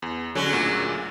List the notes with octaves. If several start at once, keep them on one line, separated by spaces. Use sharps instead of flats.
E2
D3 F#3 G#3 C#4
D2 A#2